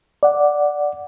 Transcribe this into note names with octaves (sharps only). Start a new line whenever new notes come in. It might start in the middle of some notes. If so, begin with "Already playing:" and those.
D5 F#5